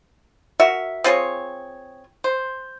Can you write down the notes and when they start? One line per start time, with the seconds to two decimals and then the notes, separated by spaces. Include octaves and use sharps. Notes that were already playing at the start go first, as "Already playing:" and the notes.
0.60 F#4 A#4 E5
1.04 C4 F4 G#4 C#5
2.24 C5